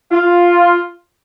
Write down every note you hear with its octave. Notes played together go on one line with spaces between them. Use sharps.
F4